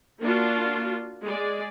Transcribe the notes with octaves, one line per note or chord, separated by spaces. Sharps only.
A#3 D4 F4 F#4
G#3 G#4 D5